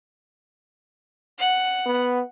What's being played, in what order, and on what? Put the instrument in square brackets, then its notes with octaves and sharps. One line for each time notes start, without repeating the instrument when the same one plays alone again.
[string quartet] F#5
[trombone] B3